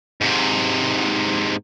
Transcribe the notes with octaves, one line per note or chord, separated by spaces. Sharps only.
G#2 C3